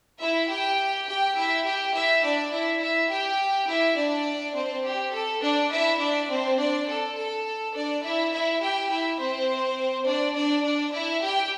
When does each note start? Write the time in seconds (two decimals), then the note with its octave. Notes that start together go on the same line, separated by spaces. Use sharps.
0.20 E4 E5
0.49 G4 G5
1.07 G4 G5
1.36 E4 E5
1.64 G4 G5
1.94 E4 E5
2.23 D4 D5
2.52 E4 E5
2.80 E4 E5
3.10 G4 G5
3.68 E4 E5
3.96 D4 D5
4.55 C4 C5
4.84 G4
5.13 A4
5.42 D4 D5
5.71 E4 E5
5.99 D4 D5
6.29 C4 C5
6.57 D4 D5
6.87 A4
7.17 A4
7.74 D4 D5
8.03 E4 E5
8.32 E4 E5
8.61 G4 G5
8.89 E4 E5
9.19 C4 C5
10.06 D4 D5
10.35 D4 D5
10.64 D4 D5
10.93 E4 E5
11.22 G4 G5